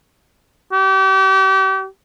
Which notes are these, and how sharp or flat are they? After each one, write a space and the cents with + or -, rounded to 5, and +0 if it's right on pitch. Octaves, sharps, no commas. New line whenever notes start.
G4 -35